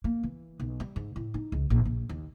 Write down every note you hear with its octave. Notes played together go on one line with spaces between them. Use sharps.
A#3
E3
B1
G3
G#2
A2
D#4
C#2
A#1
A#1
D#2